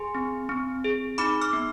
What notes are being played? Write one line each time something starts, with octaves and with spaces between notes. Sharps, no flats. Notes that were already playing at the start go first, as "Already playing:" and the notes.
Already playing: G#4 G#5 C6
C4
C4
G#4
D#4 B5 D6
D6 F6
B3